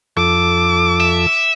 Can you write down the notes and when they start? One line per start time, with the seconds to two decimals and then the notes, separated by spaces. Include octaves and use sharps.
0.17 F2 A4 D6 E6
1.00 E5